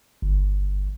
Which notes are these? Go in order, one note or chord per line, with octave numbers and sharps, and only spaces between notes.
G1